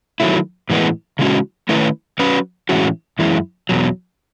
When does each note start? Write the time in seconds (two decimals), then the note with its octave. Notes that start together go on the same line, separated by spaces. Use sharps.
0.20 D#3 F#3 A3 E4
0.70 A2 E3 G#3 B3
1.19 C#3 E3 G#3 C#4 F#4
1.69 D#3 A3 C#4 E4 B4
2.19 F#3 C#4 F#4 B4
2.69 A2 E3 G#3 C#4 F#4
3.19 F#2 E3 G#3 C#4 E4
3.69 E2 B2 F#3